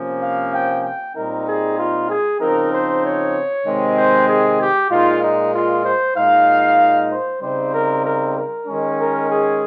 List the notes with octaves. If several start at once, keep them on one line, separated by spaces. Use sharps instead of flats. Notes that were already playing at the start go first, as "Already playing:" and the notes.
Already playing: C3 F3 A#3 C#4
F5
G5
G5
A#2 G3 C4 D#4 A#4
G#4
F4
G#4
C#3 F3 C4 D#4 A#4
C5
C#5
C3 D#3 G#3 C4
C5
G#4
G4
A#2 G#3 D#4 F4
D#4
F4
C5
A#2 G#3 D#4 F5
C5
C#3 G3 C4 D#4 C5
A#4
A#4
A#4
D#3 G#3 C#4
A#4
G#4